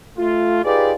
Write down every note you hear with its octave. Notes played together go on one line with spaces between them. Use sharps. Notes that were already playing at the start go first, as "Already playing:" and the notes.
A3 F4
D#4 F4 G4 G#4 B4 D5